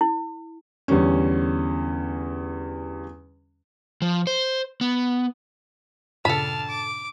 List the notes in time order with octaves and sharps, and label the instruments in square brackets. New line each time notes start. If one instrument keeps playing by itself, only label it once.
[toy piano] E4
[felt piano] E2 D3 G3 C#4
[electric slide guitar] F3
C5
B3
[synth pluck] G2 A#2 C#3 [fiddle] D4 F6 [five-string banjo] A4 B5 [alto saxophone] A5
[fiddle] D6